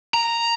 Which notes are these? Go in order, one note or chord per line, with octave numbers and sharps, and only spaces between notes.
A#5